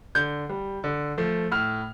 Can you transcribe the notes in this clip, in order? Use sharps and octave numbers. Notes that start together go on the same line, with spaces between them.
D3 G6
G3
D3
F3 A3
A2 F6